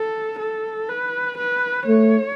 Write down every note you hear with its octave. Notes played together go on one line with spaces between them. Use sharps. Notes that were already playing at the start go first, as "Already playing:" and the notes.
Already playing: A4
A4
B4
B4
A3 C#5